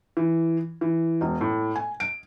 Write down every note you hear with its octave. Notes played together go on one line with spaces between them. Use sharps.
E3
E3
E1
A2
G#5
D7